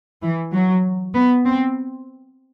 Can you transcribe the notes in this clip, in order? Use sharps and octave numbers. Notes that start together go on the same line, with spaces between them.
E3
F#3
B3
C4